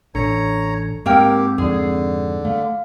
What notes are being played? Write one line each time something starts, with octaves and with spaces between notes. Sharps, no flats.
A1 D4 A4 C#5 A#5 C#7
G#2 A#3 C4 G4 A#4 G5 E6
F2 G#2 D3 G#4
A3 F5